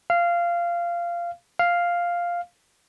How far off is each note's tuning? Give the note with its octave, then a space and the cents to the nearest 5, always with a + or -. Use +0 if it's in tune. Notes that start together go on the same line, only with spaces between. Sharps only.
F5 -15
F5 +0